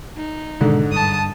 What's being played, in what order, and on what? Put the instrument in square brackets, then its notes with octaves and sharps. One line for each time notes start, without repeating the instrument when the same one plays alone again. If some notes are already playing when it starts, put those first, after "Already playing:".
[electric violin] D#4
[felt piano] G#2 D3 [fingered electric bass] B2 D#3 G#3
[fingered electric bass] G2 [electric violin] A5 D#6